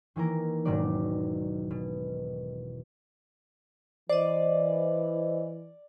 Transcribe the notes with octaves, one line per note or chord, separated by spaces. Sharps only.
D#3 E3 A#3 A#4
E1 G#2 B2 D#3 F#3 D5
B2
E3 C5 D5 D#5